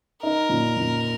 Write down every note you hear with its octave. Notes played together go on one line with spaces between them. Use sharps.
D#4 A#4
A#2
A#2